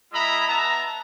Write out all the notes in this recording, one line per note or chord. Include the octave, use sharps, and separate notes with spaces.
G#3 E4 D#5 E5 A#5 B5
B3 E5 A5 A#5